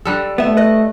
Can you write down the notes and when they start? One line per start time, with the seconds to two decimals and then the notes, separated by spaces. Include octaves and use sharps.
0.05 D3 G3 A4
0.38 A3 B3 E5
0.57 B4 D#5